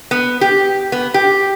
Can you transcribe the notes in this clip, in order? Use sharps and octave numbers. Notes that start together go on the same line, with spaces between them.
B3
G4
B3
G4